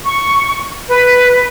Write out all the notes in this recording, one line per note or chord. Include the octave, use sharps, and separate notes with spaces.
C#6
B4